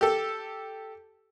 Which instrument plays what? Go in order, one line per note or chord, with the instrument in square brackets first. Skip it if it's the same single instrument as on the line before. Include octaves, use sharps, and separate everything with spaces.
[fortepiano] G4 A4